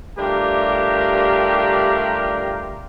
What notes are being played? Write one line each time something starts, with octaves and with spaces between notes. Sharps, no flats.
G3 A3 D4 F4 G4 A#4